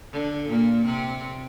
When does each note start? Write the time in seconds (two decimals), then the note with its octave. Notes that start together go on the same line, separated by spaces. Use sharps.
0.13 D3
0.48 A#2 A#3
0.85 C3 C4